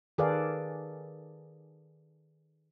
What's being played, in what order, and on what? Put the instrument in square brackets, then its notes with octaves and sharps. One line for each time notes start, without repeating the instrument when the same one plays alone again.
[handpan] D#3 G#4 A4 B4 D5 F5